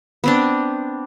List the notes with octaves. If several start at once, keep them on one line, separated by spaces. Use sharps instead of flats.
B3 C4 D4